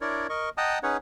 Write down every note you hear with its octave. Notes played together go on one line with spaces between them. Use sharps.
D4 E4 A#4 C#5 D5
A#4 D#5 C#6
D#5 F#5 G5 A5 A#5 D#6
C#4 D#4 G#4 B4 C#5 F#5